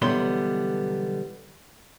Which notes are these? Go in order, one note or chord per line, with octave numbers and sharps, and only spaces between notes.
B1 D3 E3 G3 B3 C6